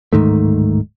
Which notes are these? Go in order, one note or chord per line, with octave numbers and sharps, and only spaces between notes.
D1 G#2 D#3 A3